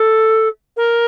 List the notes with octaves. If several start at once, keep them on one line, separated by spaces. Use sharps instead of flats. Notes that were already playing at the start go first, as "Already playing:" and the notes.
Already playing: A4
A#4